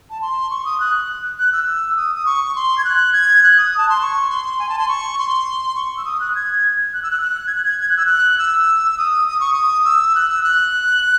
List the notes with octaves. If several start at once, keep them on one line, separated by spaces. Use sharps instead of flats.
A5
C6
C#6
D#6
F#6
F#6
E6
D#6
D#6
C#6
C#6
C6
G#6
F#6
G#6
F#6
D#6
A5
C6
C#6
C6
G#5
A5
C6
C#6
C6
C#6
E6
D#6
F#6
G#6
F#6
E6
F#6
F#6
G#6
F#6
G#6
G#6
F#6
E6
F#6
E6
E6
D#6
D#6
C#6
D#6
E6
F#6
E6
F#6